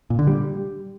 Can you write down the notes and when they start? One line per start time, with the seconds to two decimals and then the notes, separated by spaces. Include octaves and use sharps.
0.10 A#2
0.19 D3
0.27 G3